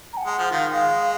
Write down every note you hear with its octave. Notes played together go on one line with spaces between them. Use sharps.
A#5
F#5
G#3
F3
D#3 F5
G#3 F5 G5